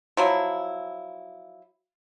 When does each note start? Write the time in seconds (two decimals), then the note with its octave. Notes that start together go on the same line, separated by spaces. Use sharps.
0.17 F3 F#3 E4